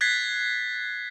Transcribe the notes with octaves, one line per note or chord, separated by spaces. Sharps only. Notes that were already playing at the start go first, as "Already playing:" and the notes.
F#6 G#6 A6 B6 C7